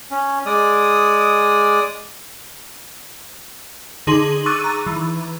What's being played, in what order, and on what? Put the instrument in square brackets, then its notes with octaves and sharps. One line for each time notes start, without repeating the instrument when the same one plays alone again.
[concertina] C#4
G#3 D5 D#6
[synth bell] D3 D#4 G#4 C6 F#7
C#6 D6 E6 F#6 A6 D#7
A#5
E3